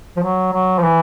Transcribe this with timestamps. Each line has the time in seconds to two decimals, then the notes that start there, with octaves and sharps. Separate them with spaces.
0.17 F3
0.23 F#3
0.53 F#3
0.79 F3
0.83 E3